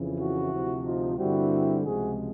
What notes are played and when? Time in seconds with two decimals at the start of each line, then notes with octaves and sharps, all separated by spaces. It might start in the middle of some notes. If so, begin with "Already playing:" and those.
Already playing: F2 C#3 E3
0.19 E4 F#4
0.52 D2 C3 F3
0.85 D#4 F4
1.18 G2 D3 G3 C4 E4 F#4
1.84 C#2 C3 F3 G#3 F#4 G#4